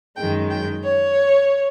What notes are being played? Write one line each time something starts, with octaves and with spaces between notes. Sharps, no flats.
F#2 D#3 G#3 G5
G5
C#5